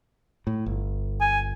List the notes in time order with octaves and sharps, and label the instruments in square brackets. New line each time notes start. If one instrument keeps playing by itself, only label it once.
[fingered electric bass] A2
G1
[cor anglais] G#5